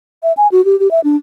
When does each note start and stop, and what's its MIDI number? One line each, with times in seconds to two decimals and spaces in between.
0.23 0.32 76
0.37 0.48 80
0.52 0.64 66
0.65 0.78 67
0.80 0.90 67
0.91 1.00 76
1.04 1.16 62